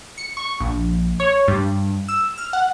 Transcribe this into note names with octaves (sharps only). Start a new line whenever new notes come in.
C#7
C#6
A#1
C#5
G2
E6
F6
F#5